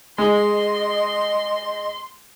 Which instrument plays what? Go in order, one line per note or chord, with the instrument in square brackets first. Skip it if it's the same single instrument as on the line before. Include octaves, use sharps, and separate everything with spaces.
[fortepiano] G#3 [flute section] D#5 [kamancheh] C6